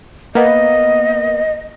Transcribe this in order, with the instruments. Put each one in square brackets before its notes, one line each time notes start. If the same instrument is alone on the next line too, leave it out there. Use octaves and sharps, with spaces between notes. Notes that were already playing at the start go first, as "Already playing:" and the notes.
[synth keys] A#3 B3 [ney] D#5